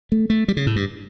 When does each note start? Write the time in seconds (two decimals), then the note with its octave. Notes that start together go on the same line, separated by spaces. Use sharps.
0.12 A3
0.30 A3
0.48 G3
0.57 C#3
0.67 A2
0.76 G2